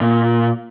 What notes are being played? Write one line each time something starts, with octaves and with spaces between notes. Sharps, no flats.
A#2